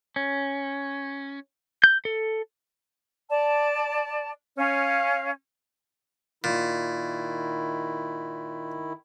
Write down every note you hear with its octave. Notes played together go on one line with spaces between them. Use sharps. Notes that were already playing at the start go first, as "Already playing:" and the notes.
C#4
G6
A4
D5 A5
C#4 F5
A#2 D#3 E4